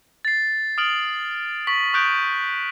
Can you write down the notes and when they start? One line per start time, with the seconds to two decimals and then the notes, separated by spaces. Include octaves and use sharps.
0.25 A6 C7
0.78 D#6 F6 D7 F#7
1.67 C#6 B6 F#7
1.93 C#6 D#6 F#6 G6 D7